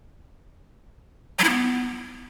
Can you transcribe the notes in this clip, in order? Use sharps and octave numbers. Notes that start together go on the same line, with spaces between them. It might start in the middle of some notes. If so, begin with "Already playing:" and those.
F#3
E4
B3